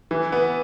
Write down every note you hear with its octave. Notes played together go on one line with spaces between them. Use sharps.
E3
B3